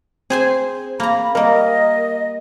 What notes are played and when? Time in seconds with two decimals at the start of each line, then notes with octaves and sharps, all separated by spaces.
0.30 C4 G#4 C5 G#5
1.00 A#3 A#5 B5
1.35 G3 A#3 A#4 D#5